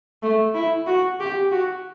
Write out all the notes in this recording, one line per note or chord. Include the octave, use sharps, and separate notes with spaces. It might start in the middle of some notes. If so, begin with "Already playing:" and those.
A3
E4
F#4
G4
F#4